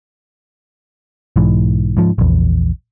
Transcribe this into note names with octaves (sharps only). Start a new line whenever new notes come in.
B1 G#2 E3
G#2 F3
A#1 E2